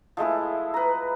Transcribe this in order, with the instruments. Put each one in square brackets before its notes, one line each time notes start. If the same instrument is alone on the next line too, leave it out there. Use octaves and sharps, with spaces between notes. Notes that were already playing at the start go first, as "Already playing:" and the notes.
[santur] F3 G#3 A3 E4
B4 A#5